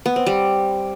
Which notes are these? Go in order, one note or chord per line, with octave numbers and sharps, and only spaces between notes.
B3
C4
G3